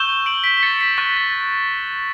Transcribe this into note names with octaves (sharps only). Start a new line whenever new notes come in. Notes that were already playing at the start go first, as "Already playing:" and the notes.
Already playing: C#6 E6 G6 E7 G7
D7 F#7
B6 D7
B6
A6 C#7
B6
C#6 F#6 A6
A6